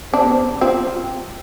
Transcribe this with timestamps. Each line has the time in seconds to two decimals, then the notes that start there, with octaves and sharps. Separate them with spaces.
0.13 C4 D4
0.21 B3
0.29 C4
0.61 C4 F4